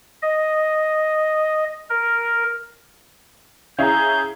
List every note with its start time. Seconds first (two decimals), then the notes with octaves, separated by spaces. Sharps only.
0.22 D#5
1.90 A#4
3.79 C#4 E4 G#4 F5 A#5 G6